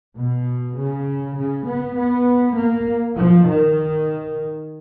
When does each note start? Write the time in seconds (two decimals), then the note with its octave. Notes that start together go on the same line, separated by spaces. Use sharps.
0.17 B2
0.77 C#3
1.37 C#3
1.66 B3
1.96 B3
2.56 A#3
3.15 F3
3.44 D#3